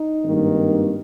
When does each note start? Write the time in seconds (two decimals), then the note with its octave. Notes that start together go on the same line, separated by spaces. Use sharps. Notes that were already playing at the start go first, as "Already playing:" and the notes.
Already playing: D#4
0.24 G#1 G2 D#3 A#3